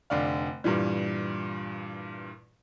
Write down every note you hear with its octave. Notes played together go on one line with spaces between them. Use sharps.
F1 D3 D5 F5
G2 A#2 E3 G3